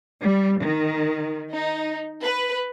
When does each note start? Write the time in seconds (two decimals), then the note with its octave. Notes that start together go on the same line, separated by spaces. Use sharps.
0.23 G3
0.62 D#3
1.52 D#4
2.22 B4